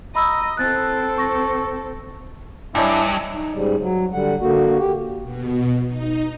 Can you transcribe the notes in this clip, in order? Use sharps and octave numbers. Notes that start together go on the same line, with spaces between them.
D#5 A#5 B5 E6
C4 A4 F#6 A6
C#6 A#6
G2 D4 E4 C#5 D#5 G#5
D#4
G#2 C#3 G3
F#3
D3 G3 F#5
D3 A#3 F#4
G4
B2
D#4